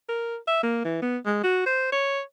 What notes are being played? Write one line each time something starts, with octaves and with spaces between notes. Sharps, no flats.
A#4
E5
A#3
E3
B3
G#3
F#4
C5
C#5